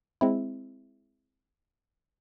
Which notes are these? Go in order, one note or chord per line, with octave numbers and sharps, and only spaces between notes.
G#3 C4 E4